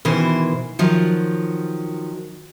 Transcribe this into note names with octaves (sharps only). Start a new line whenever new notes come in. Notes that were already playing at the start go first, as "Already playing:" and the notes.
B2 D#3 E3 C5
D#3 F3 F#3